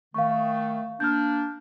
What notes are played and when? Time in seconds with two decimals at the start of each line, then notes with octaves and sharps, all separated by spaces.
0.14 D#3 A3 F5 C#6
1.00 A#3 D4 F6 G6